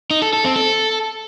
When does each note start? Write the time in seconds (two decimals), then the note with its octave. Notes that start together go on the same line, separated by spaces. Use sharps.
0.11 D#4
0.22 A4
0.33 A4
0.45 C4
0.56 A4